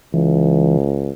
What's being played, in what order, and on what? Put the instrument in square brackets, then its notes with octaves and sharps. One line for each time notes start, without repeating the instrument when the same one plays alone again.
[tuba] C#2 [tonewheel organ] E3